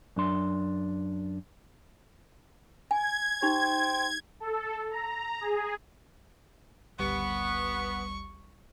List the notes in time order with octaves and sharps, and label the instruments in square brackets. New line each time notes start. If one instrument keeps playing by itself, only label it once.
[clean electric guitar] F#2 D4 C6
[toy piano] G#5 [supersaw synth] G#6
[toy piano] D#4 G4 [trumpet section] C5 G5
[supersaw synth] A4
A#5
G#4
[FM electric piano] G#1 D2 G3 [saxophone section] B3 [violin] C#6